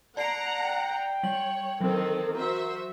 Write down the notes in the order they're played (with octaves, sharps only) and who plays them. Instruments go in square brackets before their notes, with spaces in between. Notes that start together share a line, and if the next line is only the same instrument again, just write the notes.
[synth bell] D5 C7 D7 [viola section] F#5 A#5 [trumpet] A5
[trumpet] G5
[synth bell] G3 F#7 [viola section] C#5
[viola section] D#3 C4 A4 [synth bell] E3 F#3
[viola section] F#4 C5 E5 [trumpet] A#4